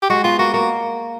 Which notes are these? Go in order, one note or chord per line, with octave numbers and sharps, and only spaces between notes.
G4
G#3 F#4
B3 F4
A#3 F#4
A#3 F#4